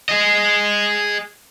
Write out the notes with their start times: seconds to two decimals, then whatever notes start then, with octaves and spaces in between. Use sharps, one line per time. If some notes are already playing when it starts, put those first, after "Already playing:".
0.09 G#4 D#5